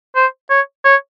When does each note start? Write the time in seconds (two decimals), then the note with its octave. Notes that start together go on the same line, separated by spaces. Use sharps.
0.16 C5
0.50 C#5
0.85 C#5